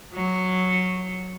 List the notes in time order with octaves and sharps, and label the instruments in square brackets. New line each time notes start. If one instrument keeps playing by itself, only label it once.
[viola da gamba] F#3